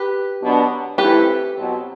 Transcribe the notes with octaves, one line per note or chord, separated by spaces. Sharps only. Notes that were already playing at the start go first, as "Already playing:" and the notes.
Already playing: G4 B4
B2 F#3 B3 D4 F#4
E3 A3 C4 E4 G4 B4
B2 F#3 C4